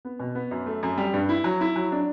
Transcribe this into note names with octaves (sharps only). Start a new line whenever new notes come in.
B3
B2
B3
F#2
A3
F#2
G3
G2
E4
F#3
E4
F#3
D4